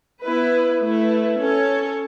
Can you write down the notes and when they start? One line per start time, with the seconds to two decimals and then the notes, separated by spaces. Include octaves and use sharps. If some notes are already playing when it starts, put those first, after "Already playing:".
0.22 B3 E4 B4
0.80 A3 E4 B4
1.39 C#4 A4 C#5